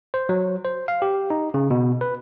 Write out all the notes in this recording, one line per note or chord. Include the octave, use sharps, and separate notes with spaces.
C5
F#3
C5
F5
G4
D#4
C#3
B2
B4